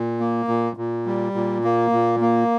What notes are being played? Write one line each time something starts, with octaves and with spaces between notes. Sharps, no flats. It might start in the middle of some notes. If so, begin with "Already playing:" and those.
Already playing: A#2
A#3
A#2
A#2
G3
A#2
A#3
A#2
A#3